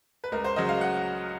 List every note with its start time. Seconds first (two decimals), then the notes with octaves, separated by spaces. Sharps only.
0.24 B4
0.32 C#2 A#4
0.44 C5
0.56 C#3 F#3 D#5
0.69 F5
0.81 F#5